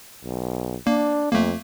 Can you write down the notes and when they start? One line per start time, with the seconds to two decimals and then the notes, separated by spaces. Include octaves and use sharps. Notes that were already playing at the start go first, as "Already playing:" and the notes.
0.24 B1
0.87 A#3 D4
1.32 F2 A3 A#3